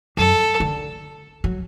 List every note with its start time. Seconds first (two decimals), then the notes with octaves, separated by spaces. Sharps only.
0.17 F#2 A4
0.60 D3
1.44 F#3